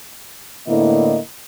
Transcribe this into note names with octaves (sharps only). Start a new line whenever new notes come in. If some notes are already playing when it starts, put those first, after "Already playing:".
A2 D3 A#3 B3 E4 D#5